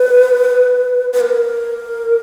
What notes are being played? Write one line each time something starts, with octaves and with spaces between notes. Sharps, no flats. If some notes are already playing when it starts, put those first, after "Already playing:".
Already playing: B4
B4
A#4